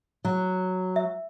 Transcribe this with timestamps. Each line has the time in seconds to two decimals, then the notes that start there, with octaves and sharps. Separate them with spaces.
0.25 F#3
0.96 E5